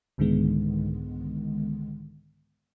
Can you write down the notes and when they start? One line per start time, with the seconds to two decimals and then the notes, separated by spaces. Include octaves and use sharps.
0.18 C2 G#2 D3 D#3 G#3 B3